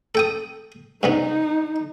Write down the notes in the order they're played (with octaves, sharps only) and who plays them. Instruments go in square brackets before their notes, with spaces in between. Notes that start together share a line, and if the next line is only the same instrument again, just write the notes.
[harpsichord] A4 G5 D#6
[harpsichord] G2 C3 B3 [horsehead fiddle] D#4